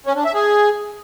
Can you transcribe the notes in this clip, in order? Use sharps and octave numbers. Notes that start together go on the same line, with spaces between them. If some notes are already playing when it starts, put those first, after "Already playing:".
C#4
D4
E5
G#4